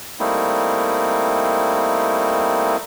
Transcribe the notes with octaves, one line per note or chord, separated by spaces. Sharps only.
G3 A3 A#3 C4 D#4 E4